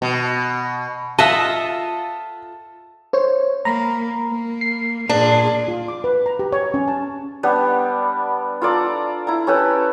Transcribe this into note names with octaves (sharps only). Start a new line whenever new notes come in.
B2
F4 A4 D#5 E5 F#5 A5
C5 C#5
A#3 A#5 B5
A#3
C7
A#2 D4 G#4
F4
D6
B4
A#5
G4
C#5
C#4
A5
G3 B3 D4
F4 A4 D5 A#5
E4 A#5
C#4 G4 A4 B4